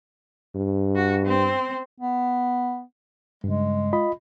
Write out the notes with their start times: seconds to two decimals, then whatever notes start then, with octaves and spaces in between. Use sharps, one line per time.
0.55 G2
0.95 F#4
1.26 C4
2.00 B3
3.44 G2 C#3 G#3
3.93 F4 D#5 B5